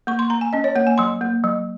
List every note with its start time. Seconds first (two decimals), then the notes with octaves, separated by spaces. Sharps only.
0.07 A#3 C#6
0.19 C6
0.30 A#3 A#5
0.41 G#5
0.53 C#4 D#5
0.64 C#5
0.76 A#3 F#5
0.87 G#5
0.98 F#3 C6
1.21 A#3
1.44 F#3